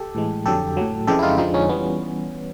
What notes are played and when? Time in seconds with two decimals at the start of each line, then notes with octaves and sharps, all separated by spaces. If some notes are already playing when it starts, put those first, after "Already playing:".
Already playing: G4 A4
0.15 A2 E3 G#3
0.46 F2 D3 F#3 G4 A4
0.77 A2 F#3
1.07 F2 C#3 E3 G#3 G4 A4
1.19 E4
1.23 D#4 F4
1.38 F2 D3 F3 G#3 D#4 F4
1.54 C#4 D#4
1.69 E3 G3 B3 C#4